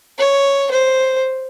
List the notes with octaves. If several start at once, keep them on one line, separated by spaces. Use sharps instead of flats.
C#5
C5